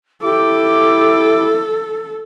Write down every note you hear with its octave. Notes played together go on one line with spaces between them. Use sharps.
E4 G4 A4 D6